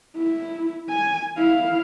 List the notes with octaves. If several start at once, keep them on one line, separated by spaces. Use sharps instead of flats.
E4
G#5
E4 F5